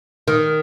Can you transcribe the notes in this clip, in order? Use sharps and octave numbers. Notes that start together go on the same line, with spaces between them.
D#3